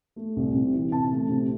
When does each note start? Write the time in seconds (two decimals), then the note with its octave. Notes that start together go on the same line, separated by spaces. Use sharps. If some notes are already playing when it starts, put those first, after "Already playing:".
0.16 A3
0.36 C2
0.55 C3
0.73 E3
0.92 C3 A5
1.12 A3
1.30 C3